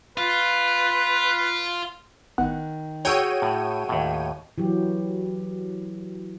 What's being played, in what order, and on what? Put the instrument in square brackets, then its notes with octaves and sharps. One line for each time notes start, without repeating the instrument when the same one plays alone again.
[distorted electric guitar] F4 [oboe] B4
[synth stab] A1 B3 F#5 [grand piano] D#3
[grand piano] F#4 G#4 E6 [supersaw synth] C#5 G5 D#7 [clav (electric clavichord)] A#5
[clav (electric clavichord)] A2
D#2 A2
[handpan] E3 F#3 G4